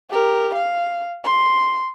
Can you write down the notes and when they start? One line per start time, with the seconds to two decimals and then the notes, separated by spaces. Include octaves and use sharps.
0.10 G4 A#4
0.54 F5
1.24 C6